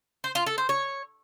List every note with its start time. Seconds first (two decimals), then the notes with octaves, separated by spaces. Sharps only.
0.24 C5
0.35 F4
0.46 A4
0.58 C5
0.69 C#5